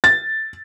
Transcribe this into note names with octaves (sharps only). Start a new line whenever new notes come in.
A6